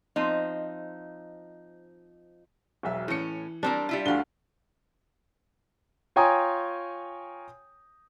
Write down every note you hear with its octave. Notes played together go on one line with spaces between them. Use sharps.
F3 C4 D#4
E1 B1 E5
A2 E3 C#4 C#7
G3 C4 D4 A#4
G3 E4 F4
D2 D3 F#4 F5 G7
F4 C#5 G5 G#5 A#5 D#6